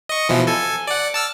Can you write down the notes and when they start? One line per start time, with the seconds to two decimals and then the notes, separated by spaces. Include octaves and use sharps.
0.09 D#5 C#6
0.29 B2 E3 F3
0.47 A4 G#5
0.87 D5 F#5
1.14 A5 E6 F6